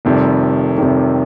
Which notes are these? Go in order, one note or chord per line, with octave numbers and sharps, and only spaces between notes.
F1 F2 C3 D#3 G3
F1 F2 C3 D#3 G3